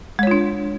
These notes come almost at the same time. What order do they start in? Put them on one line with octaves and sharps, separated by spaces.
G#3 C#5 F4 D4